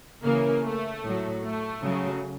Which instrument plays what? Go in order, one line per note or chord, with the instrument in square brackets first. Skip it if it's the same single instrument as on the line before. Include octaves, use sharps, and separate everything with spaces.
[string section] C#3 E3 A#3
A3
A2 F#3
A3
C#3 F#3